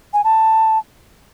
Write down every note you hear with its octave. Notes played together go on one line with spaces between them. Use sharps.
G#5
A5